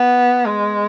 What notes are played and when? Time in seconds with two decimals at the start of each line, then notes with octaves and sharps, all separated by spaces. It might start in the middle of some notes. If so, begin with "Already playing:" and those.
Already playing: B3
0.46 G#3